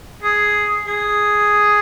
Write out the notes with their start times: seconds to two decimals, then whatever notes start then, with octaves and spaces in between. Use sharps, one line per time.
0.23 G#4
0.86 G#4